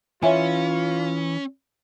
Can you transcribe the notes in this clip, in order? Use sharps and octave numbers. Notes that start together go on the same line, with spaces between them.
E3 C#4 F4 C#5 E5 G#5